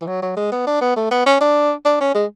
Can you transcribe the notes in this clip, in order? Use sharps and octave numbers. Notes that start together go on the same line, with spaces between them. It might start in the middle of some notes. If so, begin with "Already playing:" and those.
E3
F#3
F#3
G#3
B3
D4
B3
A3
B3
C#4
D4
D4
C#4
G#3